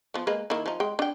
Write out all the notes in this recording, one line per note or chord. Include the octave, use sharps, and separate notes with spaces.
F3 B3
G#3 A#3 B4
D#3 A#3 E4
F3 D#4
G#3 G5
D4 G5